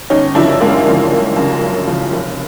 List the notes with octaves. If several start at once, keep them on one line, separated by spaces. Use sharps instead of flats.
G1 C#4 D#4
F#2 C#3 F3 D4 E4
G1 G#3 A#3
F#2 C#3 F3
G1
F#2 C#3 F3
G1
F#2 C#3 F3
F1